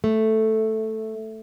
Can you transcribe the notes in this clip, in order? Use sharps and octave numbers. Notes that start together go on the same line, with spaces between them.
A3